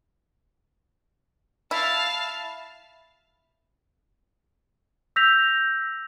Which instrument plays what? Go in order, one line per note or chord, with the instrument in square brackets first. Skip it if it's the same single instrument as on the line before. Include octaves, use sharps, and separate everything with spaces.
[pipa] E4 [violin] F5 A5
[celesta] E6 G6 A#6 B6 F7